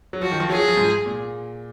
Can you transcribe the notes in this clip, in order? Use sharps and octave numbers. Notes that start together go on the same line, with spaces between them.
F#3
F3 F#4
D#3
F3
F#3 G#4
F#3
F3
G#2
A#2